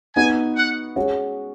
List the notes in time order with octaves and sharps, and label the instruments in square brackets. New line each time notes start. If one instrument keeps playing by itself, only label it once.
[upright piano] B3 D#4 F#4 [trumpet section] G#5
[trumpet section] F#5
[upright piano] G#3 C#4 F#4